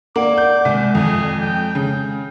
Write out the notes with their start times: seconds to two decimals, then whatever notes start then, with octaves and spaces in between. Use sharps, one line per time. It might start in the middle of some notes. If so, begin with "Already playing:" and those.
0.16 A#3 D5 F#5 D6
0.38 G6
0.65 C2 G#3
0.95 F2 G#4
1.41 G5
1.75 C#3